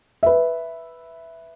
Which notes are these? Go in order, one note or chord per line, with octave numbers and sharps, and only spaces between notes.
B4 E5